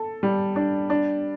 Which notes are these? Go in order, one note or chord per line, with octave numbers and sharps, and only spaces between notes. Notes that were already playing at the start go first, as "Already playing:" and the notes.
Already playing: A4
G3
D4
D4